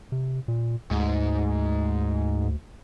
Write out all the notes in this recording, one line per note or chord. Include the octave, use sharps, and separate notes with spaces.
C3
A#2
D2 G#2